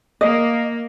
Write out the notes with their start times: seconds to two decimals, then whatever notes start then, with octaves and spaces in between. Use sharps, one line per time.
0.21 A#3 D#5